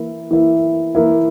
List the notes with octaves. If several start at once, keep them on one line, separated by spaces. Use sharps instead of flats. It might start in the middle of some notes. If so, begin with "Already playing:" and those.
Already playing: E3 A#3 E4
E3 A#3 E4
E3 A#3 E4